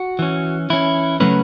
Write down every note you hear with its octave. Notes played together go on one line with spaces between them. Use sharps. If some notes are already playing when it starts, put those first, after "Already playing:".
Already playing: F#4
E3 C#4
E3 C#4 E4
C#3 F#3 A3 C#4 B4